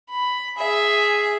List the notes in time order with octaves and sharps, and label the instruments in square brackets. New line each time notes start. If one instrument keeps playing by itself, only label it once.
[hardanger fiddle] B5
G#4 E5